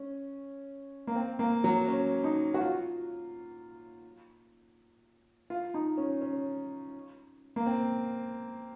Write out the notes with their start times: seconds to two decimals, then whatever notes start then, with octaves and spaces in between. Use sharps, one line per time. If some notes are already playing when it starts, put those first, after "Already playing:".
Already playing: C#4
1.07 A#3
1.15 C4
1.39 A#3
1.64 F#3
1.88 C#4
2.24 D#4
2.54 F#4
2.60 F4
5.50 F4
5.74 D#4
5.97 C#4
6.21 C#4
7.56 A#3
7.66 C4